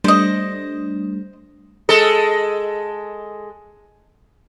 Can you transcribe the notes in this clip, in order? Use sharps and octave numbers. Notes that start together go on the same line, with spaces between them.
G3 A3 D4 C5 D#5
G#3 A4